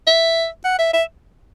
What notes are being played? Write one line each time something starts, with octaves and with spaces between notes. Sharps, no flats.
E5
F#5
E5
E5